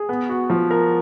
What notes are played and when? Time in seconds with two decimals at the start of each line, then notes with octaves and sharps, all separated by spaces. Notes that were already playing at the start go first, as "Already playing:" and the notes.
Already playing: G#4
0.09 B3
0.29 F#4
0.50 F3
0.71 A#4